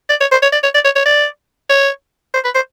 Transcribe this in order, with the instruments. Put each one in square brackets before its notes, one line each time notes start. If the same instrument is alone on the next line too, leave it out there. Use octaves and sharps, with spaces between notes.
[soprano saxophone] D5
C#5
C5
C#5
D5
C#5
D5
C#5
C#5
D5
C#5
C5
B4
C5